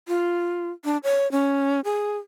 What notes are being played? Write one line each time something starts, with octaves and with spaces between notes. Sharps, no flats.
F4
D4
C#5
C#4
G#4